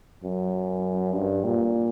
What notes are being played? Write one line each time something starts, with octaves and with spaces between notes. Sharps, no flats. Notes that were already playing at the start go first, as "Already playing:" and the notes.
F#2
G2
A#2